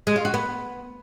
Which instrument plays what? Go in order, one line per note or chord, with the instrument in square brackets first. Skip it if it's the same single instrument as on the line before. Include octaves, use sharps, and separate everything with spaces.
[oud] G#3
F4
F#4
B3